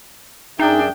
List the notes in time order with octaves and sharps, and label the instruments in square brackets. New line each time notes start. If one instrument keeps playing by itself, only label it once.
[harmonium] F#2 G#4 E5 [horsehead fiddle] D4 G5 [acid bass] D#4